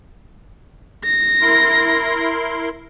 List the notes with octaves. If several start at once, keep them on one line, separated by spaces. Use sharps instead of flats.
A#6
E4 A#4 C6